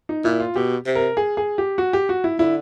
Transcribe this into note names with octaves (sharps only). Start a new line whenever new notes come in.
D#4
A#2 E4
F4
B2 G4
C3
A#4
G#4
G#4
G4
F#4
G4
F#4
E4
D3 E4